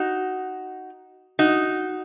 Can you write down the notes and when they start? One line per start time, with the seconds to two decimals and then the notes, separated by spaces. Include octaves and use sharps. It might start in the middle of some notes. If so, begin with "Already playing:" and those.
Already playing: D#4 F#4
1.39 D#4 F#4